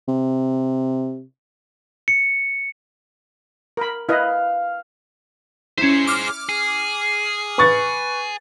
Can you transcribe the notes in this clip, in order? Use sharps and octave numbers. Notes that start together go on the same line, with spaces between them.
C3
C#7
A#4 B5
E4 B4 D#5 F5
C#4 E4 G#4 C5
D6 F6
G#4
B4 C#6 A6